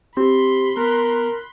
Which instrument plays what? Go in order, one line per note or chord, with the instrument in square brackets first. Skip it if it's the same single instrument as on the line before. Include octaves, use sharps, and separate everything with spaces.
[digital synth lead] C4 [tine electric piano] G4 [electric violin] B5 C6
[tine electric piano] B3 [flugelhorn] A#4 [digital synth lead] F#6